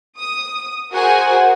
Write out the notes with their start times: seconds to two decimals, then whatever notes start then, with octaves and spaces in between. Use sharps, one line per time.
0.16 D#6
0.93 F#4 G#4 A#4 C5 F#5 G#5